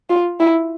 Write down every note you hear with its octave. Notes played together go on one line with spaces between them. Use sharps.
F4
E4